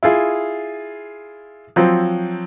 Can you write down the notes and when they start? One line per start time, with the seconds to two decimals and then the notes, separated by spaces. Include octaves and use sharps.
0.03 E4 F4 G#4
1.76 F3 F#3 C4